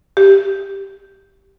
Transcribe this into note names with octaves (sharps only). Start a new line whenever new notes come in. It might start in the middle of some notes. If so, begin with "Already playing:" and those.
G4